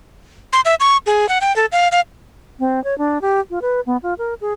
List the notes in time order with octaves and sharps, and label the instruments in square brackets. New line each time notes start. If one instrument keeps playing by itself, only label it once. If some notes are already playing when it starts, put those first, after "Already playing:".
[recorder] C6
E5
C#6
G#4
F#5
G5
A4
F5
F5
[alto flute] C4
C#5
D4
G4
F4
B4
B3
F4
A#4
G#4